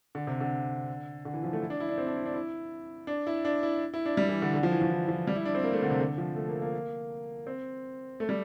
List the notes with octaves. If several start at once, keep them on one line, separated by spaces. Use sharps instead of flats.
D3
C3
D3
D3
E3
F3
A3
E4
D4
E4
D4
C4
D4
E4
D4
E4
D4
E4
D4
E4
E4
D4
G3
E3
D3
D3
F3
E3
F3
E3
F3
G3
E4
D4
C4
A#3
A3
D3
C3
D3
F3
A3
A#3
A#3
C4
A3
G3